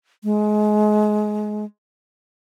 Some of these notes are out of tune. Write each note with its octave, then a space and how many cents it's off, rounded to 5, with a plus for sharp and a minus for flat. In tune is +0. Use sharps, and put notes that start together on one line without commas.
G#3 +25